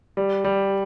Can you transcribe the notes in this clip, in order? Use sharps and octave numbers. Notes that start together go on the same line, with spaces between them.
G3
G3